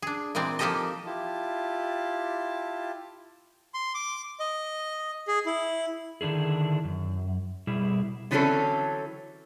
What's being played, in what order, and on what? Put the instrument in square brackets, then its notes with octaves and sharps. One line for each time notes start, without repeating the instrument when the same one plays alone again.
[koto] D4 G#4
A#2 E3 G#3 C4 D5
F3 A#3 D#4 G4 A4 D#5
[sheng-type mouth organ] E4 F4 G4 A5
C6
D6
D#5
G#4
E4
[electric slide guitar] D3 D#3 D4 E4 G#4
F#2
B2 G3 E4 G#4
[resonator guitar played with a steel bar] D3 E3 F#3 C4 C#4 A4